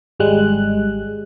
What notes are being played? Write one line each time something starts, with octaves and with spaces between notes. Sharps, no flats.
G#1 G3 G#3 F#6